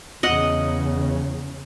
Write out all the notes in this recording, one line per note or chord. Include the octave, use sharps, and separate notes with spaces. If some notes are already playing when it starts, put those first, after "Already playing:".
E2 C#3 D#5 F#5